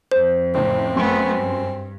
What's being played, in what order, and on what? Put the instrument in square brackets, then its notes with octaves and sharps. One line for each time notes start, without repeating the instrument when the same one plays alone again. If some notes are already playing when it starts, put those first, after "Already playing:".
[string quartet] F2 [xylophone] C5
[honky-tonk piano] F#1 A2 [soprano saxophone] C4
[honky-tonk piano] F#2 C6 [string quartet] A3 B3
[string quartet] G2